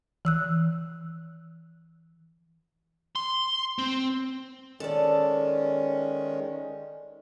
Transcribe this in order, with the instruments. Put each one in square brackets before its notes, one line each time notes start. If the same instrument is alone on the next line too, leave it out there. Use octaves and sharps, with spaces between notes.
[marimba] E3 E6 F#6
[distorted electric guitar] C6
C4
[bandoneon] D#3 G#3 C#4 [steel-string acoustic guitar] A4 D5